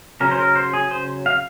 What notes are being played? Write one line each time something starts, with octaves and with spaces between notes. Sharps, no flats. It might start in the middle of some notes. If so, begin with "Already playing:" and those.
C#3 F#3 C#4 A#4
C5
A#4
C5
G#4
C5
F5